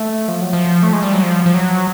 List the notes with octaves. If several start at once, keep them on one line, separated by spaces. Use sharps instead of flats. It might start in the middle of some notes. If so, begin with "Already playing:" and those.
Already playing: A3
F3
F#3
F3
A3
G#3
G3
F#3
F3
F3
F#3